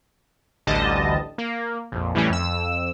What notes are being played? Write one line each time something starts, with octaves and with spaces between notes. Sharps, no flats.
A1 D2 D3 G3 D#5 A5
A#3
A#1 F2
A2 E3 G3 A3 C#4
F2 E6